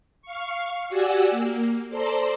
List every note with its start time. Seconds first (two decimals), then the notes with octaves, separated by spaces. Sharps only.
0.22 F5 C#6
0.89 F#4 G4 D5 F#5 G#5 E6
1.30 A#3
1.89 A4 C5 D5 A#5 C6